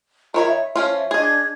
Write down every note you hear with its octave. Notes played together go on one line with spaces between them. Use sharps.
D#3 F4 A#4 C#5 A#5 B5
E5
F3 C#4 F4
D4 G#4 D#5 G#6